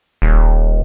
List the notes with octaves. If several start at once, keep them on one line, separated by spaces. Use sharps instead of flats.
D#1